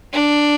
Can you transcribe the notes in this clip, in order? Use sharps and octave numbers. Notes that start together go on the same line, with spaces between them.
D4